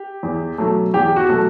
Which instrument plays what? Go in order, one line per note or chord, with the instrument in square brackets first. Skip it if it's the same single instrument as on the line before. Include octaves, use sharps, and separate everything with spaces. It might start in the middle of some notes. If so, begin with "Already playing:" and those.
Already playing: [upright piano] G4
E2
B2 F#3 A3
E2 G4
F#4
B2 F#3 A3